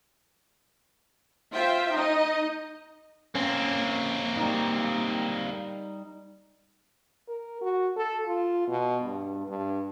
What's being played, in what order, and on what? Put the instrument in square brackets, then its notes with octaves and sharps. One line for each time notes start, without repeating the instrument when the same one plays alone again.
[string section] F4 C5 E5 G5
D#4 D#5
[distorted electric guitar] A#3 C4 [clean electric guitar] C#4
[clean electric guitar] G3 D#4
[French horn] A#4
F#4
A4
F4
B2
G2
G2